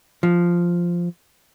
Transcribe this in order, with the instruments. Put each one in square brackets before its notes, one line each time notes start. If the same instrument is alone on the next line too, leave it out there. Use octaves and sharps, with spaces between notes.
[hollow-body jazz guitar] F3